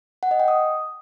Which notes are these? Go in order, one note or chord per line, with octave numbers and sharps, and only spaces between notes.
F#5
D#5
G5
D#6